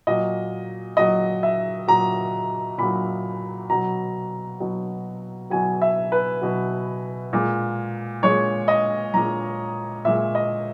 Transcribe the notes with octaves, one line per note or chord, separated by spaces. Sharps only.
A#2 F#3 D#5
A#2 F#3 D#5
E5
A#2 F#3 A#5
A#2 F#3 B5
B2 F#3 A#5
B2 F#3
B2 F#3 G#5
E5
B4
B2 F#3
A#2 G#3
A#2 G#3 C#5
D#5
A#2 G#3 A#5
A#2 G#3 E5
D#5